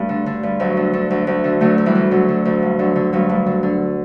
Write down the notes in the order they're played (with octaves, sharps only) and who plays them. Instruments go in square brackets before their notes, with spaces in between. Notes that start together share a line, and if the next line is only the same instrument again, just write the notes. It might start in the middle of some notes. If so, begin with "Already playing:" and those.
Already playing: [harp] G2 G3 A3
D3
D3
G2
D2 F#3
D3
D3
D2
D2
D3
D3 F#3 A3
D2
E3 G3
D2
D3 F#3
D3
D2
G2
D3 F#3
D3
G2 F#3
G2
D3
D3